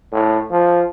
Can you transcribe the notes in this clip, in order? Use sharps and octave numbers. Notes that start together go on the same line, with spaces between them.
A2
F3